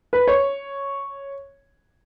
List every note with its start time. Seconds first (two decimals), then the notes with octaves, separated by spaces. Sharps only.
0.13 B4
0.28 C#5